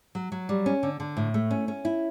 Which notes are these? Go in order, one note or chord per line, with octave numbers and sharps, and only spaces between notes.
F#3
F#3
G3
C#4
D3
D3
A2
A3
C#4
C#4
E4